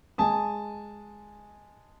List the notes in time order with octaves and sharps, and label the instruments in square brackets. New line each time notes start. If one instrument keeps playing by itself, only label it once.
[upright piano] G#3 G#5 A5 D#6